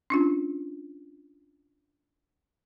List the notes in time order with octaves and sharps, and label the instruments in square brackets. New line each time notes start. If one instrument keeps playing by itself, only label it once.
[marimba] C#4 D4 F4